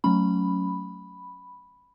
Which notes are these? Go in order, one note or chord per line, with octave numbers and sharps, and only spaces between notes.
F#3 A3 C#4 B5